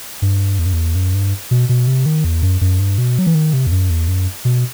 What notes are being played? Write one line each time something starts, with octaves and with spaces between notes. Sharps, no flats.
G2
E2
F#2
E2
F#2
G2
B2
B2
C3
D#3
E2
F#2
F#2
G2
B2
F#3
E3
D#3
C3
E2
F#2
E2
F#2
B2